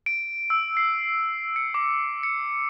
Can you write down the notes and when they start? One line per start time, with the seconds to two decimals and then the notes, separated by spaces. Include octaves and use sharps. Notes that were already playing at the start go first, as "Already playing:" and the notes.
0.06 D7
0.50 E6
0.77 C7
1.56 C#7
1.74 D6
2.23 C#7